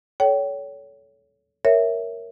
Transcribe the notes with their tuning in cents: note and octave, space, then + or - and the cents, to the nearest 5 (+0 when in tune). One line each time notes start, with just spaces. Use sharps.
A4 -20 C#5 +25 G5 -25
A#4 +0 C#5 +0 E5 +0